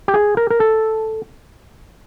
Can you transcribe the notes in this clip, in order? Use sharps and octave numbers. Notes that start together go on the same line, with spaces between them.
G4
G#4
A#4
A#4
A4